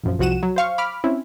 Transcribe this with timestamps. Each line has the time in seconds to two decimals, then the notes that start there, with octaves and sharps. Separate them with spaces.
0.04 A#1 F#2 F3
0.19 C2 F3 F#4 F#5 D#7 E7
0.43 F#3
0.56 C5 F5 C#6
0.78 B5 D6 F6
1.04 C4 C#4 E4